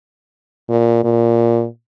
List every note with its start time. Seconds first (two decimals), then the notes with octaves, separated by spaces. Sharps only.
0.70 A#2
1.04 A#2